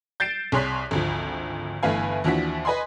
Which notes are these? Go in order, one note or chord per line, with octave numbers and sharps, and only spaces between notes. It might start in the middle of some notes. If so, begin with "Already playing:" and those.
G6 A6 C7 D7 E7
C2 G#4 C#5 C6 F#6 B6
G#1 D2 F3
G1 E3 A3 B4 F5 G#5
D#2 E3 F3 D4 F#4 B6
B4 D#5 G#5 B5 C6